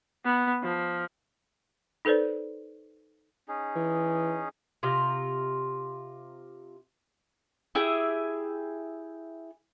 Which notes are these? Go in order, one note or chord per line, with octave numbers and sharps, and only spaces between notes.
B3
F3
D#4 A4 B4 C5 D5
C#4 D#4 G#4
E3
C3 F4 D#5
E4 G4 G#4 E5